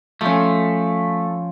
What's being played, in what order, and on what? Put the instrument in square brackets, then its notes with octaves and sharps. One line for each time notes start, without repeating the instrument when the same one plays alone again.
[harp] F3 C#4 [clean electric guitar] A3